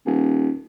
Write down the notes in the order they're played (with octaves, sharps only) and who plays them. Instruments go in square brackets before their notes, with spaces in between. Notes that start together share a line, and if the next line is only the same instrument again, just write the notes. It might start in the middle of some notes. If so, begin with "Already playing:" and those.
[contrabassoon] D#1